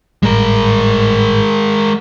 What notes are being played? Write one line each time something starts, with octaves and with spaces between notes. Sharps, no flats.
G#1 A2 G3 G#3 A#4